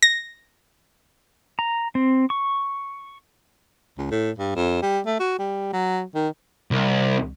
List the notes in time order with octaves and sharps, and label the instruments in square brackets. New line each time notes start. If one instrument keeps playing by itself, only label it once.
[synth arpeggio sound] A#6
[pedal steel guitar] A#5
C4
C#6
[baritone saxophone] C#2
A2
G2
F2
G3
A3
F#4
G3
F#3
D#3
[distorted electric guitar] C2